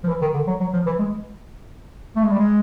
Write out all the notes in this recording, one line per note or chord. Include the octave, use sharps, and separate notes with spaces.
F3
E3
D#3
D3
F#3
F#3
F3
E3
G#3
A3
G#3
G3
G#3